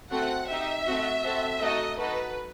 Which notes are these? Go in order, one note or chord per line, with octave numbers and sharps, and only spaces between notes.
A3 C4 F#4 A4 F#5
D#4 G4 E5
A3 C4 F#4
C4 F#4 A4
A3 D#4 F#4 A4 D#5
D#4 F#4 A4 B4